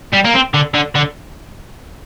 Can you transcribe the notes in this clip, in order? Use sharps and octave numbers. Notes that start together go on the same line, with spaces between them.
G3
A#3
C4
D3
D3
D3